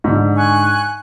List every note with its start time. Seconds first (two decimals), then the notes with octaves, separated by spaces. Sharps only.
0.04 G#2 D3
0.36 G#5 C#6 F#6